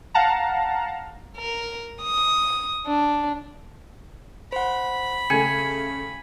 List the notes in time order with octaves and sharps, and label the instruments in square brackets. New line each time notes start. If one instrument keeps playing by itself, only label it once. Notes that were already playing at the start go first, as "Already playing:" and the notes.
[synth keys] F5 F#5 A5 A#5
[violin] A#4
D#6
D4
[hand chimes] C5 F#5 [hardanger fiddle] B5
[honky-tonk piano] C#3 A3 [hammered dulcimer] G#5 [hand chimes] C#7